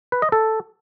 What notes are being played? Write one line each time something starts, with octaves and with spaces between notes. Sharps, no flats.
B4
D#5
A4